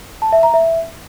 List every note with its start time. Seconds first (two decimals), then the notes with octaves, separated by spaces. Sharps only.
0.22 A5
0.32 E5
0.43 A#5
0.54 E5